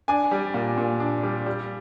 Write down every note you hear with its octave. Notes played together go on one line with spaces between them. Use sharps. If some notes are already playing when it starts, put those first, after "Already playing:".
D4 G#5
G3
A#2
A#2
D4
G3
G3